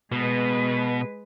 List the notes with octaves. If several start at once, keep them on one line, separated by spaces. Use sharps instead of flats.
B2 G#3 B4